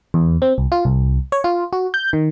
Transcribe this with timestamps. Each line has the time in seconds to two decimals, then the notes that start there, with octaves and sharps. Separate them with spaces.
0.14 E2
0.42 C4
0.58 C2
0.72 F4
0.85 C2
1.32 C#5
1.44 F4
1.73 F#4
1.94 G6
2.13 D#3